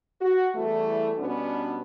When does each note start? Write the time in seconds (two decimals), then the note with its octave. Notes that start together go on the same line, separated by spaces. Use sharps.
0.20 F#4
0.55 E2 E3 G3 A3
1.18 B2 G3 B3 C#4 D4 F#4